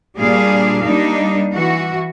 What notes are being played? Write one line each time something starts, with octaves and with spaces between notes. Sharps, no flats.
A#2 G3 D4 G#4 F5
G3 A#3 D4 D#4
E3 F#4